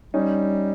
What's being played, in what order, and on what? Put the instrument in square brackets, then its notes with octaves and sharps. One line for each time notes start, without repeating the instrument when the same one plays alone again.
[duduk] G3 [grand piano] C#4 D#4